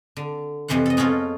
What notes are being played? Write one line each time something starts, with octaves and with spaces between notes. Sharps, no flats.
D3
F2 C3 E3 C5 F#5
A4 D#5
G#3 B3 C#4 F4 A4